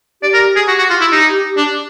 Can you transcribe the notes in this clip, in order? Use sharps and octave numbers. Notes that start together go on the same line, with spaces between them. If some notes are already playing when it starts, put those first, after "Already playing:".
G4 D5
A#4
G#4
F#4 G4
F#4
F4
E4
D#4
D4